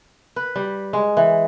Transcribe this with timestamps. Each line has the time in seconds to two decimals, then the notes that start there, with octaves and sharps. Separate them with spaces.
0.36 B4
0.56 G3
0.93 G#3
1.17 E3